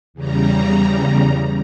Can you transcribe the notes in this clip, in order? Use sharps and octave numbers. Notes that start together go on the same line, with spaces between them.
E2 C#3 G3 A#5